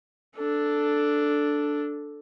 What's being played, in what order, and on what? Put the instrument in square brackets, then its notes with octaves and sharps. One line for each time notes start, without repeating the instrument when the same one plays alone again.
[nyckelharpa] D4 A4